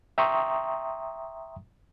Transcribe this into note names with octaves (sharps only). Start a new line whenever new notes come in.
E5 G5 A#5 C6 C#6 D#6